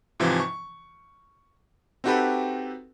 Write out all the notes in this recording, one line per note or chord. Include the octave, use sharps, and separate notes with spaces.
G#2 C3 E3 F3
C#6
C4 D#4 F#4 G4 A4 B4